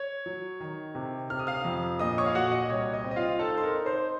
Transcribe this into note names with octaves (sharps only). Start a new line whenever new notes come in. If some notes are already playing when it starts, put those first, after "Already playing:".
Already playing: C#5 C#6
F#3
D#3
C3
C3 F6
D#6
F5 F6
F2
A#2 D#5 D#6
C#5 C#6
F5
A#2 F#4 F#5
D#5
C2 C#5
D#5
C4
D#5
F4 F5
D#4 A4 A5
C6
A#4 A#5
D#4
C5 C6